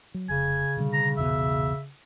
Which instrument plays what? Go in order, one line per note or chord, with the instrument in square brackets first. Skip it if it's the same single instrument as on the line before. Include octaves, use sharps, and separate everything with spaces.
[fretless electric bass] F#3
[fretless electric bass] F1 [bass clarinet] C#3 [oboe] G#5
[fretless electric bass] B2 D3 G3
[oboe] A#5
[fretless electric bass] A#1 E2 B2 [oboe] E5